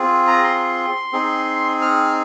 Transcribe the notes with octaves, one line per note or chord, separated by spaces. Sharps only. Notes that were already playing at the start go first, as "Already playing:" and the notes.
Already playing: C4 F4 G#4
A#5
C6
C4 D#4 G#4
F6